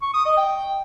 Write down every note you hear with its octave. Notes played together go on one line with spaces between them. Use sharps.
C#6
D#6
D#5
G5